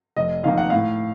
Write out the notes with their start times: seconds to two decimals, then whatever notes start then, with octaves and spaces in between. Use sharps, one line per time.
0.16 F1 D#5
0.43 F2 D#3 A#3 F5
0.58 F#5
0.70 A2 F5